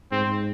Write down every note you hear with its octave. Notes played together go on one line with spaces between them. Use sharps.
G#2 C4